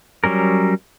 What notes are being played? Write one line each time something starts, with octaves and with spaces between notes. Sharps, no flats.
F#3 G3 C#4 A#4